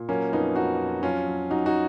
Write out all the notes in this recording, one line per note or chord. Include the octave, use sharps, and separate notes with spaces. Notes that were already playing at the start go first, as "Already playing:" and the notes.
Already playing: A#2
F#3 A#3 C#4
F2 B3 D#4
F2 D#4 F#4
F2
F#3 C#4 F4
F#3
F#3 D#4 F#4
D#4 F#4